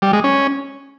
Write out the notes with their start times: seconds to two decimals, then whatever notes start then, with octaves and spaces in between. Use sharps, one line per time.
0.02 G3
0.13 G#3
0.24 C#4